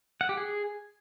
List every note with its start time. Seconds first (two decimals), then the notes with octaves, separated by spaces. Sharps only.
0.21 F#5
0.29 G4
0.37 G#4